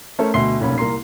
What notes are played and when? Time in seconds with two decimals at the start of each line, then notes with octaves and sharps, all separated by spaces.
0.19 A3 C#4 A4 A#4 C5 C#5
0.34 D2 B2 E5 C6 C7 G7
0.61 F1 B1 A#2 C#4 F4 B5
0.78 C2 A#3 A#5 C6 C7